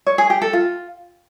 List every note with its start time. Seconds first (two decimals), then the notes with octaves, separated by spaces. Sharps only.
0.07 C#5
0.18 G#4
0.30 G4
0.42 A4
0.53 F4